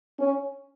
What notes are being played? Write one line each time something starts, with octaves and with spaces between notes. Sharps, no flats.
C#4